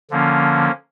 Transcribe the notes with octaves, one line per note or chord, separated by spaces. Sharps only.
D3 F3 A#3 C#4